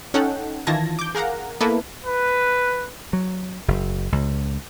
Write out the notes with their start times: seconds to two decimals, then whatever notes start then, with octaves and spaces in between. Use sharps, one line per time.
0.14 C#4 D#4 A4 F#5 G5
0.67 D#3 E3 F4 A5 G#6 A#6
0.99 D6 G6
1.15 G#4 A#4 F5 F#5 A#5
1.61 A#3 B3 E4 A4 B4
2.05 B4
3.13 F#3
3.68 F#1
4.12 C#2